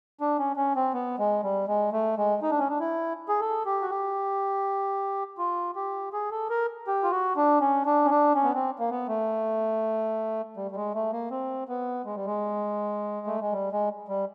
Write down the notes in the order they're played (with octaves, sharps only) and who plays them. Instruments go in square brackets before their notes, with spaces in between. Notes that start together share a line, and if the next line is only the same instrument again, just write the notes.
[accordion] D4
C#4
C#4
C4
B3
G#3
G3
G#3
A3
G#3
D#4
D4
C#4
D4
E4
G#4
A4
G4
F#4
G4
F4
G4
G#4
A4
A#4
G4
F4
F#4
D4
C#4
D4
C#4
D4
C#4
B3
C4
A#3
B3
A3
G3
G3
G#3
A3
A#3
C4
B3
G#3
G3
G#3
A3
G#3
G3
G#3
G3